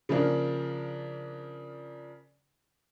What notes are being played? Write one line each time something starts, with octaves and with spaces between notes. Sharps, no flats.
C#3 F3 A#3 D4